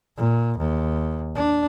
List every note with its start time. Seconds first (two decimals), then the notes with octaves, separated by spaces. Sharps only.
0.17 A#2
0.58 D#2
1.35 D4